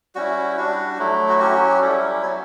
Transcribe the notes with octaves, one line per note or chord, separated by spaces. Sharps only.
G3 C#4 E4 F#4
G3 D4 F#4
F#3 A3 E4
F#4
F#3 C#4 F#4 G4
G4
G3 C#4 E4 A4
F#3 B3 F#4 C#5